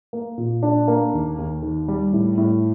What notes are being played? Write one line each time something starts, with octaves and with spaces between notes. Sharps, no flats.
A#3
A#2
D4
A#3
D#2
D#2
D#3
G3
A2
A2